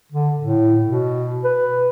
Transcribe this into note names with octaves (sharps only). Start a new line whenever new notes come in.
D3
A2
B2
B4